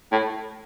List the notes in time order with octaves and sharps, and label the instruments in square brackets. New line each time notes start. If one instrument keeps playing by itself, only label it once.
[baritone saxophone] A2